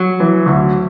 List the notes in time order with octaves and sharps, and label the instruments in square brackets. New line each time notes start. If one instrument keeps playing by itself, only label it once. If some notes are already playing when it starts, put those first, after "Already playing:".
Already playing: [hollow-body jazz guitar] F#3
[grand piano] E3
D2